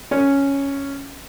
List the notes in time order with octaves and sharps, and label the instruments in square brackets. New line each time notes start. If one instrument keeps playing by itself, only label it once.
[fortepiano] C#4